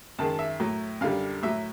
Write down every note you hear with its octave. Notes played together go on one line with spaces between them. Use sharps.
F#2 D#3 G#3 A5
E5
A2 F#3
F#2 D3 G3 F5
A2 F#3 E5